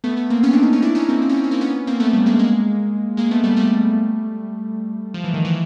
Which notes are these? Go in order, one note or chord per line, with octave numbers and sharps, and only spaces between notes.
A3 B3
A3 B3
A#3 C4
B3 C#4
C4 D4
C#4 D#4
C#4 D#4
D4 E4
C#4 D#4
A#3 C4
C4
C#4
C4
C#4
A#3 C4
B3 C#4
A#3 C4
A3 B3
G3 A3
G#3 A#3
G#3 A#3
G#3 A#3
A3 B3
G3 A3
G3 A3
F3
E3
D#3
E3